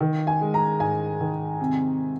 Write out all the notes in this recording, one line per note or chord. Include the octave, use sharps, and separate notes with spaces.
D#3
G#5
G#3
A#5
G#2 G#5
D#3
C3